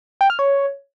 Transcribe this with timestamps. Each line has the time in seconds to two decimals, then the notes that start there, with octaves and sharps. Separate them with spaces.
0.21 G5
0.30 F6
0.39 C#5